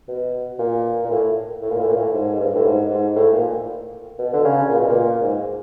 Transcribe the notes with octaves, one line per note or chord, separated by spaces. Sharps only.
B2
A#2
A#2
A2
A2
A#2
A2
A#2
A2
G#2
G#2
G2
A2
G#2
G#2
A2
A#2
B2
D3
C#3
A#2
B2
A#2
G#2